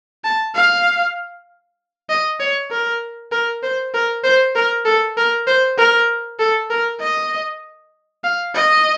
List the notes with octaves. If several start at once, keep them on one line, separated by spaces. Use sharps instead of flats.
A5
F5
D#5
C#5
A#4
A#4
C5
A#4
C5
A#4
A4
A#4
C5
A#4
A4
A#4
D#5
F5
D#5